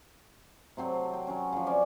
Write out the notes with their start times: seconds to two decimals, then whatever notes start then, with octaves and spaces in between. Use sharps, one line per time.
0.77 C3 F#3 C4 A4
1.13 G5
1.27 F#3 C#4
1.52 C#3 F3
1.67 C4 C#4 D5 E5